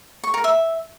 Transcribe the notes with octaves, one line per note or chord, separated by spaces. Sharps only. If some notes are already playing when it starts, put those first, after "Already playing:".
C#6
A#4
E5